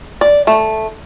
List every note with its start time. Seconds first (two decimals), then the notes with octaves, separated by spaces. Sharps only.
0.21 D5
0.47 A3